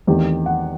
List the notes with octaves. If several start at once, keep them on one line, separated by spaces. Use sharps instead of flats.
E2 D#3 A3 C4 G4
F#5